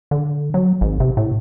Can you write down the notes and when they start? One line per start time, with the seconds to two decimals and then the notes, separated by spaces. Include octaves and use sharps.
0.11 D3
0.54 F#3
0.81 G#1
1.00 C3
1.17 A2